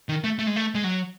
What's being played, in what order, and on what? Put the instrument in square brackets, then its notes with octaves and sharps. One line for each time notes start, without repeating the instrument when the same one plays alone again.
[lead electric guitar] D#3
A3
A3
G#3
A3
G#3
F#3